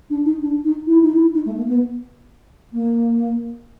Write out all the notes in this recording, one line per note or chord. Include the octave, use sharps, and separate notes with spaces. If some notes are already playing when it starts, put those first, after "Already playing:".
D4
D#4
D4
D#4
E4
D#4
E4
D#4
A3
A#3
B3
A#3